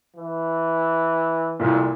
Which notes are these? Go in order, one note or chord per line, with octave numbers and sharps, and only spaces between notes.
E3
C2 F2 A#2